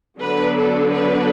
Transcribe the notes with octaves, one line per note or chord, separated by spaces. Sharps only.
D3 F#3 B3 D4 B4
A4
B4